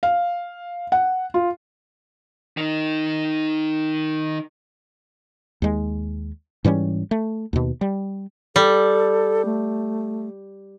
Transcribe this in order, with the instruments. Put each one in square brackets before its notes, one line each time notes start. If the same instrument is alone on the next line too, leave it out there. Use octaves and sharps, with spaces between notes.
[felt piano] F5
F#5
F4
[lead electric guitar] D#3 D#4
[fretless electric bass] D#2 G#3
G#2 E3 G3 C#4
A3
D#2 B2
G3
[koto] G3 [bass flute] A4
[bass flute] A3